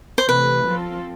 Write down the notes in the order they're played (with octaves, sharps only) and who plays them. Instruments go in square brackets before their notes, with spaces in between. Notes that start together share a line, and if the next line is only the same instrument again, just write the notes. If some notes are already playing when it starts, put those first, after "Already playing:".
[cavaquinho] C5
[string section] C3 E3 A3 [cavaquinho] B4
[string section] F3 C4 F4 A4